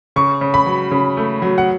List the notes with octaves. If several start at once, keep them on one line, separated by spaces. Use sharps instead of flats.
C#3 C#6
C#3
B5
F#3
C#3
A3
F#3
F#5